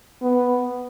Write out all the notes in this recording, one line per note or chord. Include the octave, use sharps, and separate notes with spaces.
B3